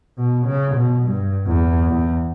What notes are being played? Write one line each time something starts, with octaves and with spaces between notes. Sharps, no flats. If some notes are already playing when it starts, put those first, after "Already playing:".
B2
C#3
B2
G2
E2
E2